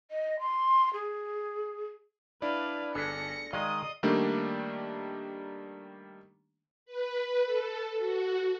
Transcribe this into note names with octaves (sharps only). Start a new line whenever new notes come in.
D#5
C6
G#4
D4 E4 B4 D5 F5
G1 D4 G#4 A4 A#6 B6 C#7
D#3 G#3 D5 D#5 F5 D#6
D#3 G3 A3 A#3 D4
B4
A4
F#4